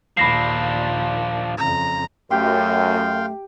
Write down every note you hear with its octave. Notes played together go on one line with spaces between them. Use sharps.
D#2 A#2 F3 D4 B5 A#6 C7
F2 C#3 A#5
F#2 A3 G4 F5 G5 C6